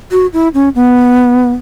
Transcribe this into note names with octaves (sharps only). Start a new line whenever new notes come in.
F#4
E4
C#4
B3